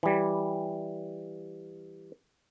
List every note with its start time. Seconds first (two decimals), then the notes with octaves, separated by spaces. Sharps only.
0.03 E3 G3